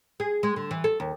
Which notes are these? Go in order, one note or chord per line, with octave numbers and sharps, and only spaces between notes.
G#4
G#3
D3
E3
A4
D#2